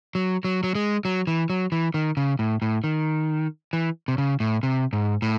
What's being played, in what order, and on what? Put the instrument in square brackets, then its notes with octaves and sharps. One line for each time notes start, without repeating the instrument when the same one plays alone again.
[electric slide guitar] F#3
F#3
F#3
G#3
F#3
E3
F#3
E3
D#3
C#3
A2
A2
D#3
E3
C3
C#3
A2
C3
G#2
A2